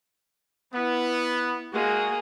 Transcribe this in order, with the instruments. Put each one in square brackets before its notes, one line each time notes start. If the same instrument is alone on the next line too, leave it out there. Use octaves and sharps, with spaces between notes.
[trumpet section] B3 [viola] E4
[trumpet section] G#3 F#4 [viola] A#3 G#4